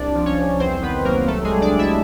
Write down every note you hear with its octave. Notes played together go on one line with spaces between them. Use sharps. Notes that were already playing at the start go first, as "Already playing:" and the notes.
Already playing: C2 D4 D5
F3
C#4 C#5
C2
E2 C4 C5
D#3 B3 B4
F#3 A#3 A#4
C2 A3 A4
G#3 G#4
G3
D4 D5
C2
E4 E5